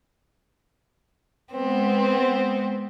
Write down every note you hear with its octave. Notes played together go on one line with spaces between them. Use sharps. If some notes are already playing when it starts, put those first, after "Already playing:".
G#3 B3 C4